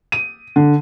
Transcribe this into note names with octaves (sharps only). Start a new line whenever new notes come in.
D#7
D3